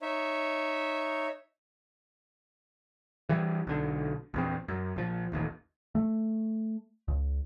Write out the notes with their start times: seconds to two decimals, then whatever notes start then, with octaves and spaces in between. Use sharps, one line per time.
0.02 D#4 C#5 E5
3.29 E3 G3
3.67 B1 D3
4.34 A#1 E2 C4
4.68 F#2
4.96 A#1 F3
5.32 D#1 A1 D#2
5.95 A3
7.08 C#2